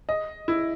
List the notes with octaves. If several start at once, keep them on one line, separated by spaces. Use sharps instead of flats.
D#5
E4